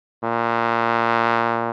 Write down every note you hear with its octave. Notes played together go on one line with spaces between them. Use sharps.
A#2